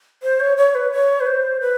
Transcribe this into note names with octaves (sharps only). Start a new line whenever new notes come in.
C5
C#5
C#5
B4
C#5
B4
C5
B4